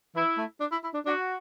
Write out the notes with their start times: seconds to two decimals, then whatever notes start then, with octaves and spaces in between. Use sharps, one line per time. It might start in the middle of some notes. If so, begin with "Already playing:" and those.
0.15 E3 E4
0.38 A3
0.60 D4
0.72 E4
0.84 E4
0.94 D4
1.06 D4 F#4